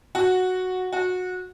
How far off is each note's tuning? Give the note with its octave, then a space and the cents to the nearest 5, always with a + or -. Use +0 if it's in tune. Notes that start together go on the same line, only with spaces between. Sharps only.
F#4 -5
F#4 -20